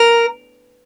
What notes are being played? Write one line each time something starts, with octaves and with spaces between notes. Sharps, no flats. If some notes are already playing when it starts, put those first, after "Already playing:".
Already playing: A#4